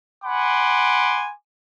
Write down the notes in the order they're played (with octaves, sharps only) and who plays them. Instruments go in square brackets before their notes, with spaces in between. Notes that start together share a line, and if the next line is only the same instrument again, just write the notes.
[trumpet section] F#5 G#5 B5 C6 D6